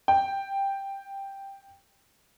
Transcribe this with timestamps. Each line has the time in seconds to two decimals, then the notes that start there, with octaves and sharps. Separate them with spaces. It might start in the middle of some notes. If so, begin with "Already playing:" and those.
0.08 G5